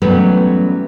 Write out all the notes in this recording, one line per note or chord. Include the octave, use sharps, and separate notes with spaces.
E3 F#3 G3 A3 B3 C#4